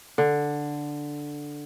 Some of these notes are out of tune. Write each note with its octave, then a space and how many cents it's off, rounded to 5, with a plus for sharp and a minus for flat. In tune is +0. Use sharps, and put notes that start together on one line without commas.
D3 +0